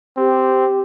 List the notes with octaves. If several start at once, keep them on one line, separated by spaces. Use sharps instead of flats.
C4 G4